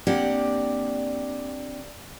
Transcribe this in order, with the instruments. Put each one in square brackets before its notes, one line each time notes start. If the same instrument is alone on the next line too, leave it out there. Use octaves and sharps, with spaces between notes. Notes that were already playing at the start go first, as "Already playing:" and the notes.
[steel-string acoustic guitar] A#3 C4 D4 G4 D5 F#5